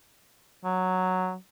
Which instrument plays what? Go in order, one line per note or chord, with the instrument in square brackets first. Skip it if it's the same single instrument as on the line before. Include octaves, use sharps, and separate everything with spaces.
[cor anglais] F#3